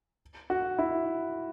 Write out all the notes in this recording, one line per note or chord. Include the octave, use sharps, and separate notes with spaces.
F#4
E4